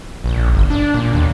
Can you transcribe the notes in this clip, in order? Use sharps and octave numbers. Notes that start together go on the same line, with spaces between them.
A#1
G1
D4
A#2
D#2